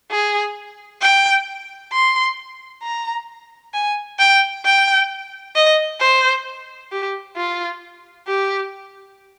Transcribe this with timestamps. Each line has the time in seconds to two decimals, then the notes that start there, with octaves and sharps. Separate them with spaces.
0.11 G#4
1.02 G5
1.93 C6
2.83 A#5
3.74 G#5
4.19 G5
4.65 G5
5.56 D#5
6.00 C5
6.92 G4
7.36 F4
8.27 G4